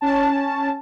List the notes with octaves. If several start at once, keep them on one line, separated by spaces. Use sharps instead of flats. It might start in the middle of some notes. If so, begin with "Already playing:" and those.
C#4 A5